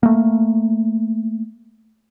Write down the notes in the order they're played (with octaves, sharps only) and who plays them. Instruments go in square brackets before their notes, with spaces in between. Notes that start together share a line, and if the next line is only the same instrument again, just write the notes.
[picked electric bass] A3 A#3